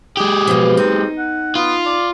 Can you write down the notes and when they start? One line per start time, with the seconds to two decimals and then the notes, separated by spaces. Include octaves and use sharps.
0.17 G#3 G4 G#4
0.47 B2 F3
0.77 C4 D#4
1.19 F#5
1.55 B3 F4
1.86 D5